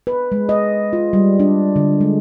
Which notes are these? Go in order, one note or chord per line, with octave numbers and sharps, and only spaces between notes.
B4
G#3
D#5
F4
G3
D4
D3
G#3